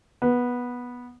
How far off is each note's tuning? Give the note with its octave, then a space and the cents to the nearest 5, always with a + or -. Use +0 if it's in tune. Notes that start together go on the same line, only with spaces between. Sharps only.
B3 -10